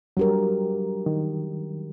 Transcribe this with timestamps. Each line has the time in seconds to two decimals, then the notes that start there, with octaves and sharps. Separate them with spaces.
0.17 F#3 G3 D4 G4 A#4
1.06 D#3